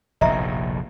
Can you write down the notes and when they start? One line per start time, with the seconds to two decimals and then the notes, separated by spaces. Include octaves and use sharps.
0.21 F1 A#1 A2 D#5 E5 A#5